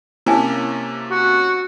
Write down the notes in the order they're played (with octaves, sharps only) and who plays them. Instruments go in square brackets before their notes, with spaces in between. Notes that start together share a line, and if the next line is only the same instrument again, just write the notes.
[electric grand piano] C3 A#3 C#4 [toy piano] E4 G#5 A5
[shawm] F#4